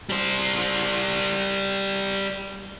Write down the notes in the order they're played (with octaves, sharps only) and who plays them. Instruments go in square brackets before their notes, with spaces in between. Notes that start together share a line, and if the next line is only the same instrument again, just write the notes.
[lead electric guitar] G3 C5